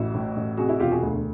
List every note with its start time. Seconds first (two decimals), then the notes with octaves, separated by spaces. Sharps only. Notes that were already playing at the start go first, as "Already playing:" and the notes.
Already playing: A1 E4 F#4
0.14 A2
0.36 A1
0.57 C3 F#4 G#4
0.69 E4 F#4
0.80 E1 F4 G4
0.91 F#4 G#4
1.02 D2